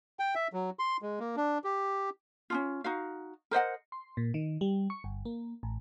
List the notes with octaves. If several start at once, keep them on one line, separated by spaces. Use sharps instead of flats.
G5
E5
F#3
C6
G#3
A#3
D4
G4
C#4 D4 F4
D#4 F#4 F5
A#4 C5 D#5 F#5
C6
A#2
D#3
G3
C#6
G1
A#3
A1